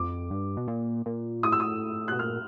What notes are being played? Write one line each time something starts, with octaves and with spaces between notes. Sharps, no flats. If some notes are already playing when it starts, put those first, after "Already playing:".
Already playing: F2 D6
G2
B2
A#2
A#2
A2 D#6
E6
D#6
B2 F#6
A#2 F6